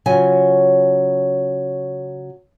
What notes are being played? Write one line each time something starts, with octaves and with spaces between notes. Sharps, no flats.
C#3 F#3 F4 G#5